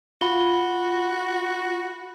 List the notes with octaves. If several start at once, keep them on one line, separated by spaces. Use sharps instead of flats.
F4 F#4 B5 G7